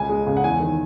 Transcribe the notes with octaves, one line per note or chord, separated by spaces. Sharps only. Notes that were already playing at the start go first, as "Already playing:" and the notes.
Already playing: C#2 G#5
G#3
C#3
F#5
E2 G#5
D#3